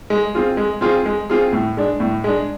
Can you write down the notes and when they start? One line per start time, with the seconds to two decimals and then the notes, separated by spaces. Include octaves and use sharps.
0.10 G#3
0.35 C4 F4 G#4
0.57 G#3
0.81 C4 F4 G#4
1.06 G#3
1.30 C4 F4 G#4
1.53 A2
1.77 G#3 D4
2.00 A2
2.24 G#3 D4